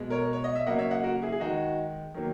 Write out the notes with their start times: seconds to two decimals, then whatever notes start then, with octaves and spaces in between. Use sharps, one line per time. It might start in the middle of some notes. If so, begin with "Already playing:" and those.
Already playing: B2 G#3
0.10 A#4 C#5
0.33 C#5
0.44 D#5
0.55 E5
0.66 C#3 F#3 A#3 D#5 F#5
0.78 C#5 E5
0.91 D#5 F#5
1.03 F#4 A#4
1.22 E4 G#4
1.32 G#4
1.40 D#3 G#3 D#4 F#4
2.14 D#3 F#3 A#3